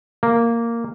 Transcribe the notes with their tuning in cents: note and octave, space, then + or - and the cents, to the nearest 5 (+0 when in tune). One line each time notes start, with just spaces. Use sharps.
A#3 -5